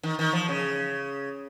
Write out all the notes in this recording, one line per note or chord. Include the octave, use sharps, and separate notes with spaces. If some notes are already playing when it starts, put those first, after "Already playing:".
D#3
D#3
F3
C#3